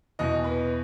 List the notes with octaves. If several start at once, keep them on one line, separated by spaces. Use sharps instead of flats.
E2 B2 D#5
B4